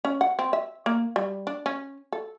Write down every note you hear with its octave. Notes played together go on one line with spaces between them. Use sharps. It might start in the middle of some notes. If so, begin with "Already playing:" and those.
C#4
F#5
C4
E5
A#3
G3
D4
C#4
A4